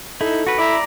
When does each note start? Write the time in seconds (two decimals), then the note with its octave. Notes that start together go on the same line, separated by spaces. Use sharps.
0.21 D#4 E4 A4
0.47 F#4 B4
0.58 E4 D5 A#5